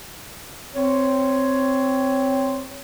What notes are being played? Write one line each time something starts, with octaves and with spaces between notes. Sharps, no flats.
C4 C#5